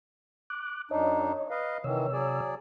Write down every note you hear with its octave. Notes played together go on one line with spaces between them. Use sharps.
D6 F#6
F#2 D4 D#4 C#5 D#5
B4 D#5 F5
C3 D#3 E3 C#5 E6
F#3 G#4 D5